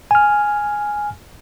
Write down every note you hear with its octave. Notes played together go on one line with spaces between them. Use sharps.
G#5 F6